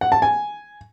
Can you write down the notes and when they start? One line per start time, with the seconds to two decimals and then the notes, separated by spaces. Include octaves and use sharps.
0.01 F#5
0.12 A5
0.22 G#5